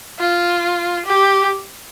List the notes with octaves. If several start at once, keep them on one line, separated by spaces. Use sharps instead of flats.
F4
G4